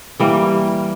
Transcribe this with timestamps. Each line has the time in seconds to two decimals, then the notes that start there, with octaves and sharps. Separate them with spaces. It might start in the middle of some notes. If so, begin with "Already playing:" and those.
0.20 E3 G3 A#3